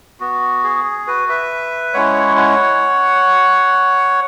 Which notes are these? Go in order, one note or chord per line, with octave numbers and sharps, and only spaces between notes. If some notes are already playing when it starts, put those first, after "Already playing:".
B3 F#4
G#4
F#4 B4
B4 E5
G#3 C#4 E4 C#5 F#5
C#5 F#5